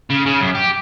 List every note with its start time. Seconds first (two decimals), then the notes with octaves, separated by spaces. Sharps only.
0.10 C#3
0.26 C#3
0.41 F#2
0.55 G4